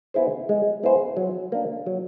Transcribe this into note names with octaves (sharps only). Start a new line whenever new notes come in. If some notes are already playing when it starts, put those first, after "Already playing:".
B3 E4 G#4 C5
G#3
B3 E4 G#4 C5
F#3
A#3 D4
F#3